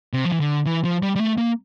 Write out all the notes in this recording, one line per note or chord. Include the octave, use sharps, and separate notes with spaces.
C3
F3
E3
D3
E3
F3
G3
G3
A3
A#3